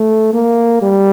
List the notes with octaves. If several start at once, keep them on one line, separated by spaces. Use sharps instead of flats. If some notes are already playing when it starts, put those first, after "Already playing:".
Already playing: A3
A#3
G3